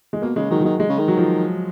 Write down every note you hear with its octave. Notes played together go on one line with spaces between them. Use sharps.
G#3
B2 A#3
C#3 G#3
D#3 F#3
F#3
D#3 G#3
G#3
C#3
D#3
F#3
F3